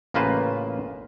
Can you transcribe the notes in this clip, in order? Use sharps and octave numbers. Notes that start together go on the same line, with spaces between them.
A1 C#3 A#3 F4 B4 C5